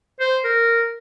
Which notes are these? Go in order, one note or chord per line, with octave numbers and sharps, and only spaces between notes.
C5
A#4